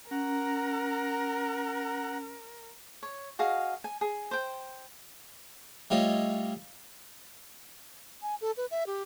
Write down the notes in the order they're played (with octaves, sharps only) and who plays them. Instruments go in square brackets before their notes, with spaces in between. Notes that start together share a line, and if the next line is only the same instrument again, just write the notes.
[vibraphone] C#4 [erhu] A#4 [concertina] F#5 A#5
[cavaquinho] C#5
F#4 G#4 D#5 F5
G#5
G#4
C5 G5
[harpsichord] G3 A3 F4 C#5 D#5
[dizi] G#5
A4
B4
E5
G4